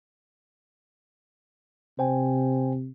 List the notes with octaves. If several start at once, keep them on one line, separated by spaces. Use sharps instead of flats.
C3 C5 G5 G#5